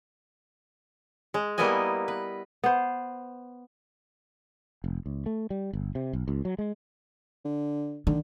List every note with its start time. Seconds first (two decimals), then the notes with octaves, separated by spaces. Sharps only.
1.34 G#3
1.58 G3 A#3 B3 E4 D#5 G#5
2.08 B4
2.64 B3 C5
4.84 F1
5.06 C#2
5.26 A3
5.50 G3
5.73 G1
5.95 C3
6.13 B1
6.28 C#2
6.45 F#3
6.59 G#3
7.45 D3
8.07 D3 D#3